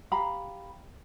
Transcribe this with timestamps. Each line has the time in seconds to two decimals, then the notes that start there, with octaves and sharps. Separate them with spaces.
0.12 G4 F5 A#5 B5